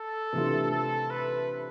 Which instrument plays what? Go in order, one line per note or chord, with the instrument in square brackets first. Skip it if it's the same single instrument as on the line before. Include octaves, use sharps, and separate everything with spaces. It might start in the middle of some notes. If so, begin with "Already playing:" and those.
Already playing: [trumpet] A4
[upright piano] C3 E3 A3 D4 F4
[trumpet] A4
B4